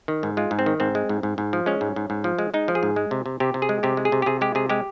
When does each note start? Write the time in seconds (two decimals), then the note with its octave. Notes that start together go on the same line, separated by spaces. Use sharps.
0.08 D#3
0.23 G#2
0.37 G#3 F4
0.51 G#2
0.59 C4
0.66 D#3
0.80 G#2 C4
0.95 G#3
1.09 G#2
1.23 G#2
1.38 G#2
1.53 F3
1.66 G#3 C#4
1.81 G#2
1.96 G#2
2.10 G#2
2.24 F3
2.39 G#3
2.54 G#3 D#4
2.68 F3
2.75 G#4
2.83 G#2
2.96 G#3
3.11 C3
3.26 C3
3.40 C3 G4
3.54 C3
3.62 G#4
3.69 G#3
3.83 C3 G4
3.97 G#3
4.05 G#4
4.12 C3
4.22 G4
4.26 C3 G#4
4.41 G#3 G4
4.55 C3 G#4
4.69 G#3 G4